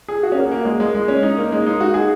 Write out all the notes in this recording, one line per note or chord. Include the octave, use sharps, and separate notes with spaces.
G#4
F#4
C#4
A#3
A#3
G#3
G#3
G#3
C#4
D#4
A#3
G#3
D#4
F#4
G#4